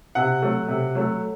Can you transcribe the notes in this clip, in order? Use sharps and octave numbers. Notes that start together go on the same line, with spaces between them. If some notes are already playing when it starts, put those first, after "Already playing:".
C3 F#5
F#3 A3
C3
F#3 A3